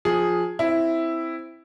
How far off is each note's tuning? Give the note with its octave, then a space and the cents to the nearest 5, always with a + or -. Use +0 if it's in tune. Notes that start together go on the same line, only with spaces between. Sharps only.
F3 +15 G#4 +0
C4 +0 E4 +0